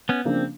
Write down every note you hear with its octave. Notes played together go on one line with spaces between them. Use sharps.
B3 C#4
C#3 F3 A#3 C4 D4